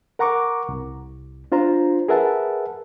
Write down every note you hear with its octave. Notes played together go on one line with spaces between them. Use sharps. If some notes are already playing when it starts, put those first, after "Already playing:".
A#4 F#5 A#5 C#6 D6
C2
D4 F4 C5 A#5
G#4 A#4 B4 E5 F#5 A5